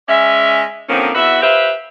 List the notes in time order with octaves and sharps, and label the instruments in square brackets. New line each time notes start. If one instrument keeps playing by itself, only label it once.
[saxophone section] G#3 C#4 D5 E5
D3 D#3 F3 A#3 C4 C#4
E2 F#4 B4 E5
F4 G4 B4 C5 E5